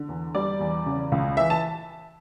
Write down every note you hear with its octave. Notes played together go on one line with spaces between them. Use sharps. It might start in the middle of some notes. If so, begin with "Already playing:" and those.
Already playing: D3
E2
G3 D5
E2
C#3
C#2
E3 E5
A5